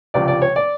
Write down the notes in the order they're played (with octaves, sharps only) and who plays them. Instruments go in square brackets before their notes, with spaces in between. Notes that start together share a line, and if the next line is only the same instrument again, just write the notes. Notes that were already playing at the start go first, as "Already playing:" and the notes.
[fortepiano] C#2 C3 F3 D5
D5
C#5
D5